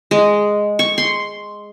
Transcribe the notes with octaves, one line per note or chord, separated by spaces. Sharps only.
G#3
C#6
C6